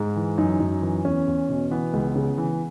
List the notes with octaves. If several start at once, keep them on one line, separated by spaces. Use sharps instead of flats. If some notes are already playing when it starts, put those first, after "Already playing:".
Already playing: G#2
E3
F#2 D#4
F#2
E3
E2 C#4
E2
B2
E3 B3
C#2
C#3
E3